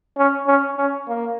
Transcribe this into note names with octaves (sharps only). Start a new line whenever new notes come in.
C#4
C#4
C#4
A#3